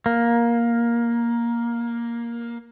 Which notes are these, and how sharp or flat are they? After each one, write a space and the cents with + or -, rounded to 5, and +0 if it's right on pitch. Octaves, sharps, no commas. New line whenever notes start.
A#3 +10